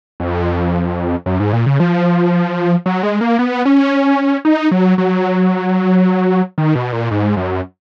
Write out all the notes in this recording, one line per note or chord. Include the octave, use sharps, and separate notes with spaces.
F2
F#2
G#2
A#2
C#3
F3
F#3
G#3
A#3
B3
C#4
D#4
F#3
F#3
D#3
B2
A#2
G#2
F#2